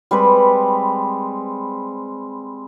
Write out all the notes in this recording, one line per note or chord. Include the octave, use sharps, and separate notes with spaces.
G3 G#3 C4 B4